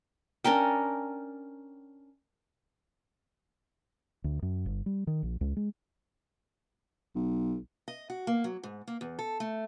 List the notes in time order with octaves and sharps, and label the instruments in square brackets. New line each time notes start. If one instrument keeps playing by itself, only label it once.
[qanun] C#4 D4 A#4 G5
[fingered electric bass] D2
F#2
G1
G3
D#3
A#1
C#2
G#3
[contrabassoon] B1
[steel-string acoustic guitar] D#5
F#4
A#3
F#3
G#2
A#3
E2
A4
A3